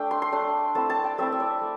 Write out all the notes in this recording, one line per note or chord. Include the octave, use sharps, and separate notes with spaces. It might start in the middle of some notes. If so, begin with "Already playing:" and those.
Already playing: A3 D4 G5
C6
C6
A3 D4
A3 C4 E4 A5
A5
G5
A3 C4 E4 E5
E5
D5
A3